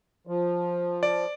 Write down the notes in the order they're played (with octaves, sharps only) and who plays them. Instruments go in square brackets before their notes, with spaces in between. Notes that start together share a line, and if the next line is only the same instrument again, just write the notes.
[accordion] F3
[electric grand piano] D5